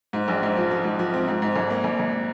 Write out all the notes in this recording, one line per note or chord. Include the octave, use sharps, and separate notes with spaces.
G#2
A#1
G#2
F3
F3
G#2
F3
C4
G#2
G#2
G#1
A#3
G#1
G#1